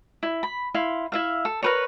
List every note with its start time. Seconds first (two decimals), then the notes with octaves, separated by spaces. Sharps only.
0.23 E4
0.43 B5
0.74 E4 F5 C6
1.12 E4 E5 F5
1.45 A4
1.62 A#4 B4 C#5